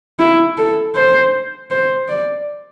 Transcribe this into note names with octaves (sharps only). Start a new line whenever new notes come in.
E4
A4
C5
C5
D5